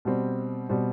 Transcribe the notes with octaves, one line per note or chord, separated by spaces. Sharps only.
B2 G3 C4
B2 G3 C4